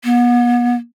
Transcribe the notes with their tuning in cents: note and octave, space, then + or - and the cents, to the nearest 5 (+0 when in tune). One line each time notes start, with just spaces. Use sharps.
B3 -35